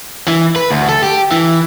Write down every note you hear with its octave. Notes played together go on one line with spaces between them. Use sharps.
E3
B4
D2
A4
G4
E3